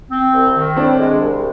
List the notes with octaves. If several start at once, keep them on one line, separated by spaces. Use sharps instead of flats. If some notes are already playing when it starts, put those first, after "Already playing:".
C4
C2
D#3
A2 C4 D4
G#3
C2